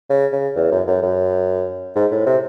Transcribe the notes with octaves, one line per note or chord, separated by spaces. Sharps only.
C#3
C#3
E2
F#2
F#2
F#2
G#2
A2
C3